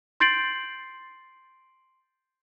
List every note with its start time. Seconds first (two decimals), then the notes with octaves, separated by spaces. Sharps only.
0.20 C6 G6 A6 C7 D7 F#7